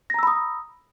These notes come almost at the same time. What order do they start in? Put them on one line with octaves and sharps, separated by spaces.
A#6 A#5 E6 B5 D#6